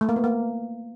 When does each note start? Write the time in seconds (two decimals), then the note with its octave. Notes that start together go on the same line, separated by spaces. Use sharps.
0.01 A3
0.09 A#3
0.16 B3
0.24 A#3